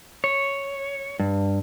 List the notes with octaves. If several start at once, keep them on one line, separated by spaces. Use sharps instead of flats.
C#5
G2